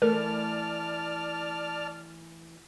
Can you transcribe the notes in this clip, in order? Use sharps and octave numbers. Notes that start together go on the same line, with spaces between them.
E3 A3 A#4 D5 A5 F6